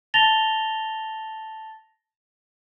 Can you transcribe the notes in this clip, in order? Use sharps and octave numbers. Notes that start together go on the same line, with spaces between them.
A5 A6 A#6 F7 G7